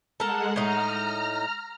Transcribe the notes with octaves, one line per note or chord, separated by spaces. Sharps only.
G#3 A4 A#4 F#5
A2 D#4 A#5 F6